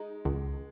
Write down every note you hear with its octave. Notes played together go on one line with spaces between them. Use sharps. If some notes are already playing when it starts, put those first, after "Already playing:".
Already playing: G#3 D#4
C#2